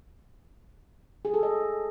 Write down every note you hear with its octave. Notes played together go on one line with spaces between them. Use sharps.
G#4
A4
D#5